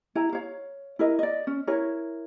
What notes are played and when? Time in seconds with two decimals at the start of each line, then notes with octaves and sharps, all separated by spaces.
0.15 E4 A#5
0.33 C#5 F5
0.99 E4 A#4 D#5
1.19 D5 D#5
1.47 C#4
1.67 E4 A#4 C#5